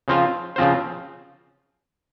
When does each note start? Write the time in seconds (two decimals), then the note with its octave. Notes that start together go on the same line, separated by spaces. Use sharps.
0.08 C#3 F3 C4 F4 C5
0.56 C#3 F3 C4 F4 C5